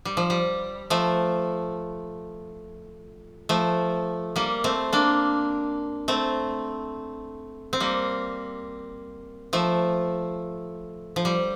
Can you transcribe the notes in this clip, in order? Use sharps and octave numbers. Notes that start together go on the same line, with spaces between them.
G3
F3
G3
F3 A3
F3 A3
G3 A#3
A3 C4
A#3 D4
A3 C4
C4
G3 A#3
F3 A3
F3
G3